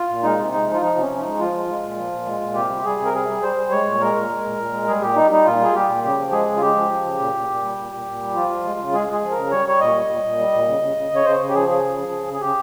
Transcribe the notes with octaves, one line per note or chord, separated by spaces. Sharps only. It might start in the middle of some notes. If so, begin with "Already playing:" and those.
Already playing: F4
A#2
G#3 D#4
C3
G#3 D#4
F3
F4
F3 D#4
C3 C#4
F3
D#4
G#3
F3 F4
G#3
G#3
A#2
F3
A#2
G#3
A#2
C3 G4
G3
G3 G#4
C3
A#4
G3 G#4
G3
G3 C5
G3
G#3 C#5
A#2
G#3 A#4
A#2
G#3
A#2
A#2
G#3
G3 G#4
A#2 G4
G3 D#4
G3 D#4
A#2 F4
G3 G#4
G3 G4
A#2
C#3 G4
F3
G#3 G#4
C#3
F4
G#3 G4
F3
F3
C#3
A#2
A#2
A#2
G3
A#2
A#2
A#2
G3
F3 F4
F3
G#3
C#3
G#3 G#4
G#3
G#4
F3
A#4
C#3
G3 C#5
G3 C#5
A#2 D#5
G3
A#2
A#2
G3
A#2
C#3
C#3
C#3
C#3 C#5
C#3 C5
C#3
G4
F3 G#4
C#3 G#4
F3
F3
C#3
C#3
G#4
C#3 G4